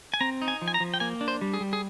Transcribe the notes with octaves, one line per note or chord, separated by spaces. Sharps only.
G#5
C4 A#5
D#4
G#5
F3
G#5
A#5
F3
G5
A#3 G#5
D4
C5
G3
G#4
G3
G#4